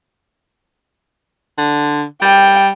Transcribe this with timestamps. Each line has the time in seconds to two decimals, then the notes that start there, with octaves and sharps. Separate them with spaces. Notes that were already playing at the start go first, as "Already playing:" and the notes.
1.58 D3
2.22 G3 G5